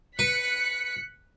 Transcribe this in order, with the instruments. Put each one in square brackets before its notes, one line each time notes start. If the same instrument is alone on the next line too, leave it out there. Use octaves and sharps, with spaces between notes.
[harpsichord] B4 [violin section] F#6 B6 C#7